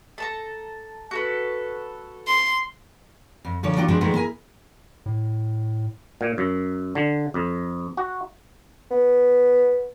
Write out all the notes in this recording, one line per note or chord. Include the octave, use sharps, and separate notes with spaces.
A4 A5 A#5
F#4 A4 B4
C6
F2
D#2 A#2 D3 F3 C#5
D#3 F#3 D4 F4 G4 C#5
F3 F#3 G#3 B3 C4 D4
A#2 D#3 F3 G#3 A3 B3
E4 G#4 A#4 G#5
A2
A#2
F#2
D3
F2
F#4
B3